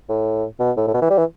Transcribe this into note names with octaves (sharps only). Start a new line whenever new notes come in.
A2
B2
A2
A2
B2
E3
G3
E3